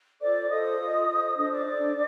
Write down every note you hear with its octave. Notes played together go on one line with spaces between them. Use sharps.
F4 A4 C5 D5 D6
F4 A4 C5 D#5 D#6
F4 A4 C5
F4 A4 C5
D4 A4 C5 D#5 D#6
D5 D6
D4 A4 C5